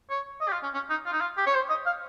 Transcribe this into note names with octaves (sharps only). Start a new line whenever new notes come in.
C#5
D#5
G4
F4
C#4
C#4
D#4
F4
D#4
F4
G4
C#5
C5
D#5
F5